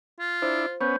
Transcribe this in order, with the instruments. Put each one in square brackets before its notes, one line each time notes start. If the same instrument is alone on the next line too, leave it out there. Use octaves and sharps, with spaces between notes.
[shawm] F4
[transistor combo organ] D4 E4 [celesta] C5
[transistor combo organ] B3 C#4 [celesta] C5 G6